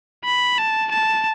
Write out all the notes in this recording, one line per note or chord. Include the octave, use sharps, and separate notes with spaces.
B5
A5
A5